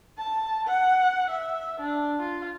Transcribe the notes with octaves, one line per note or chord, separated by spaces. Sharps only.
A5
F#5
E5
D4
F4